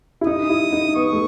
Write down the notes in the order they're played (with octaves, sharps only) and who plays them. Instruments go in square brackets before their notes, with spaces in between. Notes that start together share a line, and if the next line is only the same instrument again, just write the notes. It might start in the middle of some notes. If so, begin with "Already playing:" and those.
[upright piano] E4
[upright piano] D#4 [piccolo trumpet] D#6
[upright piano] E4
D#4
[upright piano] B3 [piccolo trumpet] C#6
[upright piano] A3